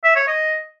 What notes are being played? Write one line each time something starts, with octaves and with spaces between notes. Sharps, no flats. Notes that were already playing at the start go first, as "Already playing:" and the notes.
E5
C#5
D#5